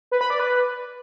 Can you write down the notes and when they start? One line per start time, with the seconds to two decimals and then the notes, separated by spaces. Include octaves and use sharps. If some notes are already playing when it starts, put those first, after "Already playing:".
0.12 B4
0.21 B5
0.30 D5
0.40 B4